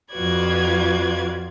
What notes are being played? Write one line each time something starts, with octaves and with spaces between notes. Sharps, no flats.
F2 F4 F#4 B4 D5 G#6